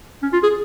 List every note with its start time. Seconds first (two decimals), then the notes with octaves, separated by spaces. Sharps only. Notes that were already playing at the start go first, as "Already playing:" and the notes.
0.23 C#4
0.33 F4
0.43 G#4